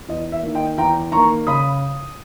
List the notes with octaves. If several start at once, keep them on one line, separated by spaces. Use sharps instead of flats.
E2 D#5
E5
D#3 A#3
D#5 G5
E2 G5 A#5
D#3 A#3 A#5 C#6
C#3 B5 D#6